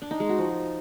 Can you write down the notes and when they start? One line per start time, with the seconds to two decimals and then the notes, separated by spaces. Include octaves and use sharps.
0.02 D4
0.11 D#4
0.20 G#3
0.29 F#4
0.38 F3